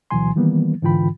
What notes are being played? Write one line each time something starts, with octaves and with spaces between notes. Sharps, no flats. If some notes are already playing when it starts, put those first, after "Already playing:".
D2 B2 E3 F#3 G#5 C6
D#3 E3 G3 A#3 B3
G#2 D3 E3 F4 G5 B5